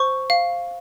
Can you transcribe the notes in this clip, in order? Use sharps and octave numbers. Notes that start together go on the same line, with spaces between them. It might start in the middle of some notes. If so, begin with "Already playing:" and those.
Already playing: C5 C#6
F5